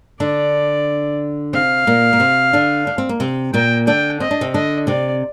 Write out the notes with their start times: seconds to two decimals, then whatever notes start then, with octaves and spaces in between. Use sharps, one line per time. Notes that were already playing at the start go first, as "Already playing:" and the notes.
0.20 D3 D4 D5
1.53 C3 C4 F5
1.87 A#2 A#3
2.13 A#3
2.20 C3 C4
2.53 D3 D4
2.87 D4
2.98 C4
3.09 A#3
3.20 C3 C4
3.54 A#2 A#3 G5
3.87 D3 D4 G5
4.20 C4 D#5
4.31 D4
4.41 C3 C4
4.54 D3 D4 D#5
4.87 C3 C4 D5